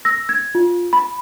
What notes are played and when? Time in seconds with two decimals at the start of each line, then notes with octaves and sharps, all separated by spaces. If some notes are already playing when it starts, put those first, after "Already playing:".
0.05 E6 A#6
0.29 G#6
0.55 F4
0.93 B5